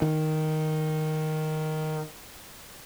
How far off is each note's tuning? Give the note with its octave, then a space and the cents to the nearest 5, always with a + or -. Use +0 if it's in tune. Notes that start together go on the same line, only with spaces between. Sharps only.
D#3 +0